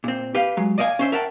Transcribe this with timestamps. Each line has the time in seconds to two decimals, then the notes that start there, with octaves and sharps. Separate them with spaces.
0.04 A#2 C4
0.35 G4 B4 F5
0.57 F#3 G#3
0.78 D5 D#5 F5 G5 G#5
0.99 C#4 C5 E5
1.12 A#4 E5 F#5 G5 A5